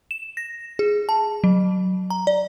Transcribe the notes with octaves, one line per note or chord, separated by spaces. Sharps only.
E7
A#6
G#4
A5
F#3
A#5
D5